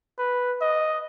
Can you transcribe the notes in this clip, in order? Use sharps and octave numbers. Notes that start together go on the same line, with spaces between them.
B4
D#5